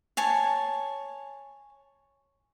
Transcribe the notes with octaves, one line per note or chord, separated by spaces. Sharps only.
C#5 G#5 A5